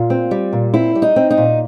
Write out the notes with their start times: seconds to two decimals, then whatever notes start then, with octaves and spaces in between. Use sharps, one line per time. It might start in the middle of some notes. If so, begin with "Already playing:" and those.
Already playing: A#2 F4
0.10 C4
0.31 G3
0.53 A#2
0.74 C4 E4
0.95 G3
1.02 D#4
1.16 C4
1.31 D#4
1.37 A#2